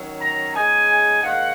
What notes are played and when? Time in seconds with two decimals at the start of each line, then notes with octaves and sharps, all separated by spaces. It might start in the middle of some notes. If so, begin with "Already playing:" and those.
Already playing: D#3 F#3 C#4
0.22 A#5
0.55 C#3 G#3 D#4 G#5
1.22 G#2 D#3 A#3 F#5